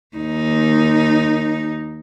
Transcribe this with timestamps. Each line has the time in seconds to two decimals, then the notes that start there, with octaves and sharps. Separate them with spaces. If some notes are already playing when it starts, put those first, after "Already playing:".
0.17 D#2 D#4